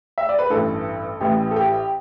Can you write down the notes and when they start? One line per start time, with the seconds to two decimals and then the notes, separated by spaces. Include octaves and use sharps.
0.18 E5
0.29 D5
0.39 B4
0.50 A1 G2 E3 A4
1.21 A1 A2 E3 G4
1.51 A4
1.56 G4